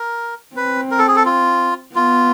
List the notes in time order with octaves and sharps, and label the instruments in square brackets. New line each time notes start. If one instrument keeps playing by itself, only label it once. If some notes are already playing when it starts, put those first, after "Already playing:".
Already playing: [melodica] A#4
[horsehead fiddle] C4 [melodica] B4
[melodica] A#4
A4
G#4
A4
F4
[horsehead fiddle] B3 [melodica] F4